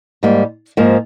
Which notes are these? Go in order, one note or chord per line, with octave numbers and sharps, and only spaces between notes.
G#2 G3 A#3
G#2 F3 A#3